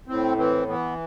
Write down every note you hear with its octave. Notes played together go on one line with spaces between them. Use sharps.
A2 C4
E3 C4
E3 B3